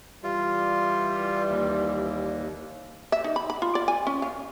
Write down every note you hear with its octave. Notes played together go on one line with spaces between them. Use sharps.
E3 G3 F4
D#2
E5
D#4
B5
B5
F4
D5
G#5
C#4
F5